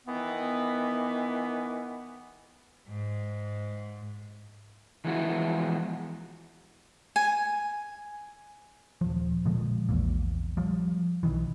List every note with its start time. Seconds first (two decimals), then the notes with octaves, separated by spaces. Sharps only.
0.07 D#3 E3 B3
2.88 G#2
5.04 E3 F3 G#3 B3 E4 F#4
7.16 G#5
9.01 D#1 F3
9.45 A#2 D3 F3 G#3
9.89 A#1 E2 A#2
10.57 F3 G3
11.23 B1 B2 D#3 E3